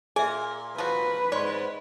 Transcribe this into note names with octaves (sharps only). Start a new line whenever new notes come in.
A#2 G#4 E5 G#5
F3 F#3 F#4 B4
G#2 C#5 D5 C6